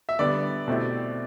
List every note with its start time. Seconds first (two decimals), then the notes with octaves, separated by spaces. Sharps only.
0.09 E5
0.19 D3 G3 B3 D5
0.68 B2 A3 C4 E4 G4